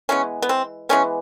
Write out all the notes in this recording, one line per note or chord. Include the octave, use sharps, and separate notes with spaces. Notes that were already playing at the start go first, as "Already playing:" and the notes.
E3 G#3 B3 C#4
B3
C4
E3 G#3 B3 C#4